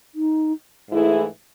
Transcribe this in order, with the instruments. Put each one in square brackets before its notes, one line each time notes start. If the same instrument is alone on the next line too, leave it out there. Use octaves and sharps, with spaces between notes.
[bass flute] D#4
[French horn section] G#2 E3 A3 E4 G#4